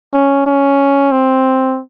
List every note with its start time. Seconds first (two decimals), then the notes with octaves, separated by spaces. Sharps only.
0.13 C#4
0.46 C#4
1.12 C4